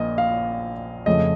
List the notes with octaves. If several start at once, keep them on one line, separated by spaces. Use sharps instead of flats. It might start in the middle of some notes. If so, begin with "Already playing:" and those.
Already playing: A#1 A#2 F3 A#3 D#5
F5
F2 C#3 F3 A3 D#5